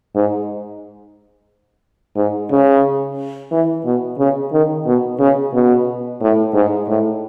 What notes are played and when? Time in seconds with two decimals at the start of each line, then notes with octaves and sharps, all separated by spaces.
0.15 G#2
2.16 G#2
2.51 C#3
3.52 E3
3.85 B2
4.18 C#3
4.52 D#3
4.86 B2
5.20 C#3
5.53 B2
6.21 A2
6.54 G#2
6.88 A2